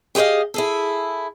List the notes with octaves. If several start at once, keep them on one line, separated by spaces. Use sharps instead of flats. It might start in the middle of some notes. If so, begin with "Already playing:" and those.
G4 G#4 C5 D#5 F5
E4 G#4 A4